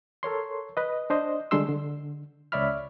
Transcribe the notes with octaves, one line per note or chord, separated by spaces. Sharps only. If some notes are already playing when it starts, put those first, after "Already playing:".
A4 A#4 C#5 C6
B4 D#5
D4 C5 D#5
D3 G3 G#3 D4 C6 E6
D3
C#2 C#5 D5 E5 B5 F6